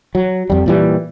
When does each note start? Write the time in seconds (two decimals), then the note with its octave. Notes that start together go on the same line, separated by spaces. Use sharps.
0.15 F#3
0.50 F2 G3
0.66 A#2 E3 G3